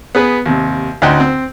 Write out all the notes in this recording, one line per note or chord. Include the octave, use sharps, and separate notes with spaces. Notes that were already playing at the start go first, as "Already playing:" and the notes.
B3 G#4 B4
D#2 C3
D2 C#4 D#4 F#5 G5 C6
C4